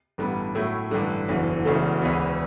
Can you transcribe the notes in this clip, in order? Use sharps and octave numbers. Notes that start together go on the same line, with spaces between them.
A1 G2 D3 G3 B3
A2 F#3 A3 E4
A1 G2 D3
F#1 E2 D3 F#3
E1 E2 C#3 F#3 A3
E1 D2 C#3 E3 B3